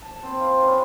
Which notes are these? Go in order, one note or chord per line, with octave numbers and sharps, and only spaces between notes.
A5
C4 C5
F4
C#4 G#4 B4 F5